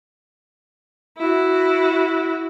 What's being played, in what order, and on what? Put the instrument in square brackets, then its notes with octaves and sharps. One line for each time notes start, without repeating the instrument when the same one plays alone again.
[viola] E4 F#4